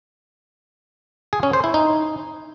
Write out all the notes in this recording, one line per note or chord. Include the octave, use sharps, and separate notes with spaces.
G#4
C#4
C5
E4
D#4